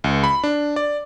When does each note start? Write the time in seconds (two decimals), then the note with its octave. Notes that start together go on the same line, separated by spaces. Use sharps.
0.04 C#2
0.24 B5
0.44 D4
0.76 D5